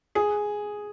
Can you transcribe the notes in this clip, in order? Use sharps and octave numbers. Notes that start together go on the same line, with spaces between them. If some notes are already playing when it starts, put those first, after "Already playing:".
G#4